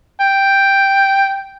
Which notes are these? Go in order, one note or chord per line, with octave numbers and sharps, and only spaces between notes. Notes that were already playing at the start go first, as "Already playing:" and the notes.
G5